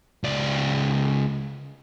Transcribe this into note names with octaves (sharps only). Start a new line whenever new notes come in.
C#2 D5